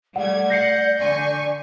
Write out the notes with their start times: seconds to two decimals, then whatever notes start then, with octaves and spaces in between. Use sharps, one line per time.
0.16 G3 A3 D5 F#5 G#6
0.50 F#5 G6 A#6 C7 C#7
0.99 D3 G#5 C#6